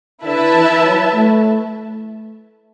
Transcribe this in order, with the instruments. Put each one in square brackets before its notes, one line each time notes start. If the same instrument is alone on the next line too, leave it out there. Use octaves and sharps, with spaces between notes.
[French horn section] D3 [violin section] E4 B4 E5 A5
[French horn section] E3
F#3
A3